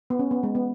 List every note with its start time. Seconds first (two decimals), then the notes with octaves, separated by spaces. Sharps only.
0.10 B3
0.19 C#4
0.31 B3
0.43 G#3
0.55 B3